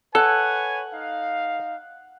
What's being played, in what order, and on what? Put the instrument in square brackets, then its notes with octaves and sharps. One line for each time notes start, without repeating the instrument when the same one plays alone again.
[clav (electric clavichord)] A4 [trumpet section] B4 C#5 G#5 [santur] F#5
[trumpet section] D#4 F5